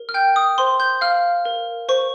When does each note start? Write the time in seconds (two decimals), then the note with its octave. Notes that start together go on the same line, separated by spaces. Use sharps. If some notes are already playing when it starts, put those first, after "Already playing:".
Already playing: A#4
0.09 F6
0.14 G5 G6
0.36 D#6
0.58 C5 C6
0.80 G6
1.01 F5 F6
1.45 A#4
1.89 C5 C#6